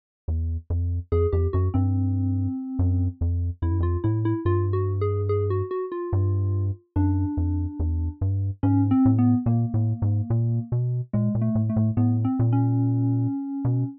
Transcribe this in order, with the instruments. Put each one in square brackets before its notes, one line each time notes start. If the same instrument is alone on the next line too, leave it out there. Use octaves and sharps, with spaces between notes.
[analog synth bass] E2
F2
[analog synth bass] F2 [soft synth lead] G#4
[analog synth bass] F2 [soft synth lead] G4
[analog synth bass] F#2 [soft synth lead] F#4
[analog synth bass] G2 [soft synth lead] C4
[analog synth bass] F#2
F2
[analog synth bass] F2 [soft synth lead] E4
[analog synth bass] F#2
[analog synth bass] F2 [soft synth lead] F4
[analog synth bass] A2 [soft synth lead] E4
[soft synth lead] E4
[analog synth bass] G2 [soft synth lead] F4
[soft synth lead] F#4
G#4
G#4
F#4
F#4
F4
[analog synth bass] G2
[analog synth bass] F#2 [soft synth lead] D4
[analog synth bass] F2
E2
G2
[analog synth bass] G#2 [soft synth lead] C#4
[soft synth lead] C4
[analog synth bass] A2
[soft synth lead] B3
[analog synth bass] A#2 [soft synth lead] A#3
[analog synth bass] A2
G#2
A#2
B2
[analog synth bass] A#2 [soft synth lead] G#3
[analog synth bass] A#2
[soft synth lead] A3
[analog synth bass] A2
[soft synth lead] A3
[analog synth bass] A2
[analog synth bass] A2 [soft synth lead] B3
[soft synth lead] C4
[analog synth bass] A#2
[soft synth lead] C#4
[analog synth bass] B2